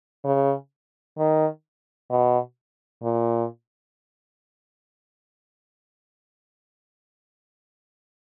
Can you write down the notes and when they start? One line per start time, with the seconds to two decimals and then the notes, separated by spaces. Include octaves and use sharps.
0.25 C#3
1.18 D#3
2.10 B2
3.03 A#2